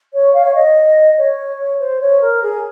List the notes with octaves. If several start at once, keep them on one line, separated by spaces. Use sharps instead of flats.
C#5
F5
C#5
D#5
C#5
C5
C#5
A#4
G#4